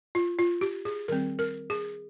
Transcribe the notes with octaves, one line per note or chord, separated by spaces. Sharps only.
F4
F4
G4
G#4
D#3 G3 C4 A#4
A#4
G#4